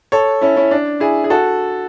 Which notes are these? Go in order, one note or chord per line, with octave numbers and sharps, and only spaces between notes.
A4 C#5
C#4 E4
C#4 E4
D4
E4 G#4
G#4
F#4 A4